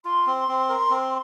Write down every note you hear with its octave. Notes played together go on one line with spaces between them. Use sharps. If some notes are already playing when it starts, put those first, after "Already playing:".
F4 C6
C4
C4
A#4
C4